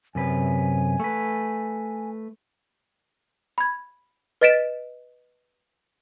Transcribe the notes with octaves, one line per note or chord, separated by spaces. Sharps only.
F#2 C3 B4 G#5
A3 B4
B5 G#6
B4 D#5 A6 B6 D7 E7